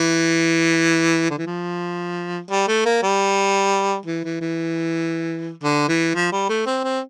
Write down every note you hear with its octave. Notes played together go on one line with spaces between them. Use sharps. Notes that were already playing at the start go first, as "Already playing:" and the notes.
Already playing: E3
D3
E3
F3
G3
A3
A#3
G3
E3
E3
E3
D3
E3
F3
G3
A3
C4
C4